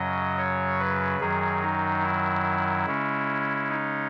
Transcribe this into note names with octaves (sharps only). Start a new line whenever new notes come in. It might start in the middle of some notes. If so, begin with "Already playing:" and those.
Already playing: F#2 C#3 F#3 D#5
C#5
B4
F#2 D#3 F#3 G#4
D#4
E4
C#3 G#3 C#4
D#4